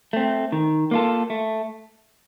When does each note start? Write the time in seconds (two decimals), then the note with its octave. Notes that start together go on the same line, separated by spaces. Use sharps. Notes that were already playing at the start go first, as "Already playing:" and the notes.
0.13 A3 C4
0.52 D#3
0.91 A#3 F4 A4
1.30 A3